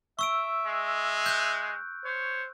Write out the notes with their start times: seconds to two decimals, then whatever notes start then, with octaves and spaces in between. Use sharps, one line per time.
0.19 E5 C#6 E6 D7
0.67 G#3
1.26 F#6 G6
2.05 C5 C#5